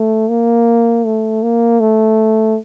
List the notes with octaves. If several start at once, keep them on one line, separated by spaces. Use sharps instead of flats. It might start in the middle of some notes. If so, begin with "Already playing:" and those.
Already playing: A3
A#3
A3
A#3
A3